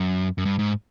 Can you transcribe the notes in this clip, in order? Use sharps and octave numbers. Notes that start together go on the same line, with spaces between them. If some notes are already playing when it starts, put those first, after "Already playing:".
Already playing: F#2
F#2
G2
G#2